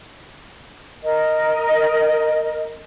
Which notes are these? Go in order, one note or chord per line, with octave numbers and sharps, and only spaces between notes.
A#4 D#5